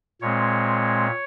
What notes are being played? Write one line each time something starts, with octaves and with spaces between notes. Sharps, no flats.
A#2 G#3 C4 C#5